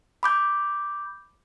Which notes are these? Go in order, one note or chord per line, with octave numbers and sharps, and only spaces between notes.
B5 D6 G6